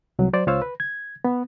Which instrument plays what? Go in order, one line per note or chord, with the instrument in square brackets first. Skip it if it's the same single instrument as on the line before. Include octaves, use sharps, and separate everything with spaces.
[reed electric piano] C2 F#3
F#3 C5 D5
C#2 F4 C5 C#5 F5 E6
B4
G#6
B3